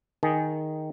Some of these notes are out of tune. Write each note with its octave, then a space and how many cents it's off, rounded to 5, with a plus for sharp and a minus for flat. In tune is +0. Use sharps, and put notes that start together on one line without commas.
D#3 +0 G#4 +0